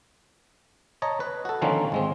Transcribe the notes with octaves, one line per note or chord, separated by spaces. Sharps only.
C#5 D#5 A5 A#5
B4
F#4 A4
D3 D#3 F3 A#3 C4 C#4
G#1 G#3 C4